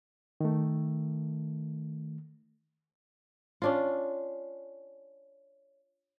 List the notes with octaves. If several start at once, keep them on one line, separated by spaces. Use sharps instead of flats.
D#3 A3
C#4 D4 F4